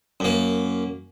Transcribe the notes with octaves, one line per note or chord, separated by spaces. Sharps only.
F#2 A#3